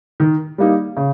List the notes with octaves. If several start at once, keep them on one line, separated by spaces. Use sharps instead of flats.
D#3
G3 A#3 D#4
C#3